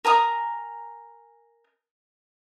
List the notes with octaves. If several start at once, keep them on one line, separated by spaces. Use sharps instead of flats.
A#4 G#5 A#5 D#6